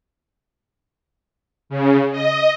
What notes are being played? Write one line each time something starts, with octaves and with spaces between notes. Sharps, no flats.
C#3
D#5